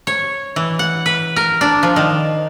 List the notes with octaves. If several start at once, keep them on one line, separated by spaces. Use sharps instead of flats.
C#5
E3
F#5
B4
A#4
D4
F3
D#3